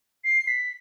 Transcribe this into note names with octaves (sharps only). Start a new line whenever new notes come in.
C7
B6